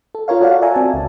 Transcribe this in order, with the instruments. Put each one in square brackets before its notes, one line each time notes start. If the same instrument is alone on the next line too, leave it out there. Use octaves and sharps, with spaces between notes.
[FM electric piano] A4
F4 A#4 C#5 F5
F#4 A4 C#5 D5 F5 F#5
D5 E5 G#5 A#5
C4 F#4 G#5 A5
C#2